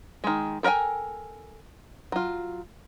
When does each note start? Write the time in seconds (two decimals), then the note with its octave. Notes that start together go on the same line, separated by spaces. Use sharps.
0.24 D#3 G#3
0.63 A4 A#4 D5 G5 G#5
2.12 F#3 F4